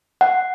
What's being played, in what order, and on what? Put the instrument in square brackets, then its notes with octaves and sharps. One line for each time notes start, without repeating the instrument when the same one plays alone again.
[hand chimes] F#5